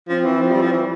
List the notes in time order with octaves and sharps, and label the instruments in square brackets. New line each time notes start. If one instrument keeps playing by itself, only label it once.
[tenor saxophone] F3 [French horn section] C4
[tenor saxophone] E3
F3
G3
F3
E3